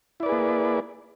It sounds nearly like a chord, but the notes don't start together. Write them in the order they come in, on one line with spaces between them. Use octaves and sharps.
E4 D5 B4 G#4 A#3